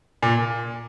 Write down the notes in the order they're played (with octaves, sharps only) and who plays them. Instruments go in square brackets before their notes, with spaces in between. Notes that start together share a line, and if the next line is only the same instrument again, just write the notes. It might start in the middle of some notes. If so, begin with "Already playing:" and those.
[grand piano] A#2